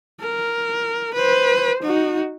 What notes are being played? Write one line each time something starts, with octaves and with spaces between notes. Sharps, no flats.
A#4
B4 C5
D#4 F#4